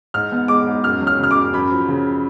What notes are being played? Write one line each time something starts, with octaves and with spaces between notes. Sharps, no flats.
G#2 F6
B3
G#3 D6
G#2
F#2 F6
F#3
F6
C#3 F6
D6
F#2
F#2 B5
F3
C#3